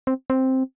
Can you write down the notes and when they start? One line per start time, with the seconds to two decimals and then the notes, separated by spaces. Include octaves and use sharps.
0.07 C4
0.30 C4